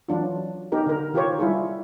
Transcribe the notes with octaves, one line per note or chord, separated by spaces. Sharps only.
E3 F#3 D4 F4
B3 D#4 G4 A#4
D3 A#4
D#3 F4 G4 A#4 C5 C#5
G3 E4 F4 G#4